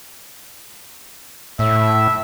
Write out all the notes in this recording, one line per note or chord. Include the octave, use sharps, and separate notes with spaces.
A2 E5